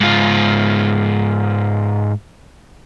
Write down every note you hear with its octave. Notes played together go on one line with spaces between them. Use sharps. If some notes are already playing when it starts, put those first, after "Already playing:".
G#2 F4